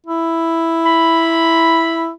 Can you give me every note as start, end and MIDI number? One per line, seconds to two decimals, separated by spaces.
0.06 2.10 64
0.86 2.06 83